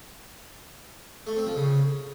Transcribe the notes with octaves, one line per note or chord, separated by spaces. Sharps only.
A3
C4
F3
C#3